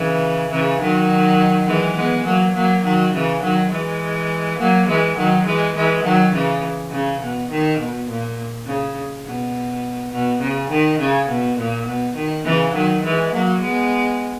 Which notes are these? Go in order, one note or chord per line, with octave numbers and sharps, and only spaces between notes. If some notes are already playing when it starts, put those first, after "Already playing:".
Already playing: C#3 E3
C#3 E3
D#3 F#3
E3 G#3
G#3 B3
F#3 A#3
F#3 A#3
D#3 F#3
C#3 E3
D#3 F#3
E3 G#3
F#3 A#3
E3 G#3
D#3 F#3
E3 G#3
E3 G#3
D#3 F#3
C#3 E3
C#3
B2
D#3
B2
A#2
C#3
B2
B2
C#3
D#3
C#3
B2
A#2
B2
D#3
C#3 E3
D#3 F#3
E3 G#3
F#3 A#3
G#3 B3